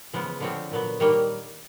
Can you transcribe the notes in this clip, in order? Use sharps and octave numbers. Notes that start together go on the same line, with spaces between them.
C#3 F3 G#3 B3
D3 F3 A3 C4 C#5
A#2 F#3 B3
D#3 G3 A#3 C#5